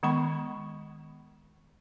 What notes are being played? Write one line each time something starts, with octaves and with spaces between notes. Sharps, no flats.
D#3 G#3 B3 B5 C#6